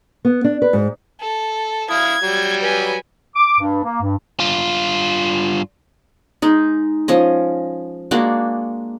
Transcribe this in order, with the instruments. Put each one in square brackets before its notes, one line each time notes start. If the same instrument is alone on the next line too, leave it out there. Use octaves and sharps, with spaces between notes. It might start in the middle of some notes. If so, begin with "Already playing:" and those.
[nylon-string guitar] B3
D4
B4
G#2
[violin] A4
[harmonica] E4 F5 D#6 [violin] G#6
[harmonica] F#3 G3
[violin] B4 G#5
[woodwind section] D6
G2
A#3
G2
[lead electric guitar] G2 F4
[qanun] G#3 D#4
F3 C#4 D#5
G#3 A#3 D4 F#4